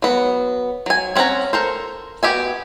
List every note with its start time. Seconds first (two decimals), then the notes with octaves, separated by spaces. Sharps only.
0.02 F#3 B3
0.86 F#3 G#5
1.16 C4 C#4 A4 F#5 A#5
1.53 A4 A#4 C5
2.23 B3 F#4 G4 E5 G#5